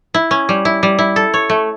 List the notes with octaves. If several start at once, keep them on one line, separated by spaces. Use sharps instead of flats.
E4
C#4
G3
E4
G3
E4
A4
C#5
A3